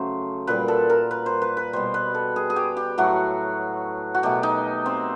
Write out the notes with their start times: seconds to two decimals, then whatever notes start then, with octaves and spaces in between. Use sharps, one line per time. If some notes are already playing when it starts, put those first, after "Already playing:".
Already playing: C#3 F#3 A3 C5
0.47 A#2 G3 B4
0.68 A4
0.90 A#4
1.11 B4
1.26 C5
1.42 B4
1.57 B4
1.73 B2 G3 C5
1.94 B4
2.14 A4
2.36 G#4
2.50 G#4
2.56 G4
2.77 G4
2.98 A2 F#3 A3 F#4
4.15 F#4
4.23 B2 F#3 A3 G4
4.43 D#4
4.86 C4